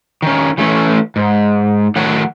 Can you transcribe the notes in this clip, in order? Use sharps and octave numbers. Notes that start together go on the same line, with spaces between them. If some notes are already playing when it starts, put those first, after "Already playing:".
D#3 C#4
E3 A3 C#4
G#2
A2 D#3 F#3 C#5 F#5